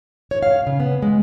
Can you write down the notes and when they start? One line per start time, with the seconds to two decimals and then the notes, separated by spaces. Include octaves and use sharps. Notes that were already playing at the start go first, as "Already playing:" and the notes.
0.31 C#5
0.42 F5
0.67 C#3
0.80 B3
1.03 G#3